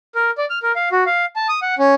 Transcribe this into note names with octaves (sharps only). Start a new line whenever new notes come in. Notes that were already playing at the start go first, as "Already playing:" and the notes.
A#4
D5
F6
A#4
F5
F#4
F5
A5
D#6
F#5
C#4